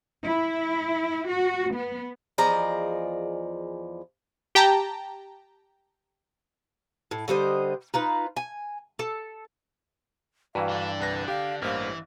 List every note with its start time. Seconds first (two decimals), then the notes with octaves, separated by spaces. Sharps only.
0.24 E4
1.29 F#4
1.72 B3
2.38 E2 F3 G#4 D5 D#5 A#5
4.55 G4 G5 A5 A#5
7.11 A2
7.28 D3 G3 C5 D#5
7.94 D#4 F4 B4
8.37 G#5
8.99 A4
10.55 G2 E3 F#4 B4 F5 A#5
10.69 D3 D4
11.00 C2 B4 F#6 A#6
11.28 G4 F5 G5
11.62 A1 G2 E3 A#3 C5 F5